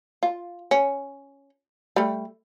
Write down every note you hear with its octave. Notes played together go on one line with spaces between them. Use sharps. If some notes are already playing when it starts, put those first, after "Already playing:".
F4
C#4
G3 A3